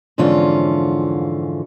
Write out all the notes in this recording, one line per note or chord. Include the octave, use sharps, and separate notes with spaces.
F2 G#2 D3 E3 C#4 F4